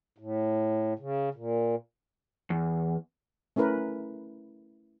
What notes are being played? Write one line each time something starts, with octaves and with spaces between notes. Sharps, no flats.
A2
C#3
A#2
E2
A3 C#4 E4 A#4 B4